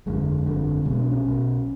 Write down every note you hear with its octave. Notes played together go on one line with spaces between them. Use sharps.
G1 F2 D3 G#3
G1 F2 D3
B1 B2 G#3
D4
C#4
B1 B2